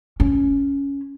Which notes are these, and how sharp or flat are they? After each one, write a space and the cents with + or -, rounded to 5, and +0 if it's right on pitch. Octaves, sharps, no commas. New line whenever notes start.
C#4 +10